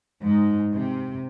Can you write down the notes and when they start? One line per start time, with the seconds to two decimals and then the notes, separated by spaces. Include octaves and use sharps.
0.22 G#2
0.72 C3